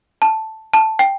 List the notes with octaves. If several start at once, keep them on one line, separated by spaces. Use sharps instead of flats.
A5
A5
G5